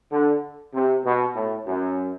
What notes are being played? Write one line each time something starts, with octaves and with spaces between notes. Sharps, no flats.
D3
C3
B2
A2
F#2